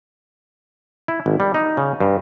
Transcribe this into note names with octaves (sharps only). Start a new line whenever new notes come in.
E4
G#1
G3
D#4
C#3
G2